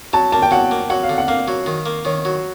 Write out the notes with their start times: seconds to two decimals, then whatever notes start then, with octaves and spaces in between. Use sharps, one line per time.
0.13 F#3 A5
0.32 A#3 A5
0.42 G5
0.51 F#3 F#5
0.71 A#3
0.90 F#3 F#5
1.03 F5
1.09 D3
1.18 F#5
1.28 A#3 F5
1.48 F#3
1.66 D#3
1.86 A#3
2.05 D#3 C#5
2.25 F#3